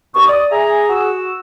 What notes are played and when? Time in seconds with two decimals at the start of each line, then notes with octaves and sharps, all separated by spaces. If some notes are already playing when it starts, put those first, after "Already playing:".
0.15 D#2 B2 C#6
0.28 D5 D#6
0.51 G#4 E5 G#5 A#5
0.89 F#4 E6